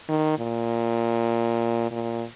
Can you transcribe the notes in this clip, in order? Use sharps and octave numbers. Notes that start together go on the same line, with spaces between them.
D#3
A#2
A#2